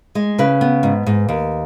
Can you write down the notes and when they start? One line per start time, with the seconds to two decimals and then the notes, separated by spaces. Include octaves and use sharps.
0.15 G#3
0.39 C#3 B4
0.61 B3
0.83 G#2
1.06 G#2
1.29 D#2